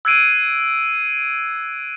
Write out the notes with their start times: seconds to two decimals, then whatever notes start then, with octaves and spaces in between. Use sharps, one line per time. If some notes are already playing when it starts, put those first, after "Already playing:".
0.05 E6 F#6 G#6 C7 D7 D#7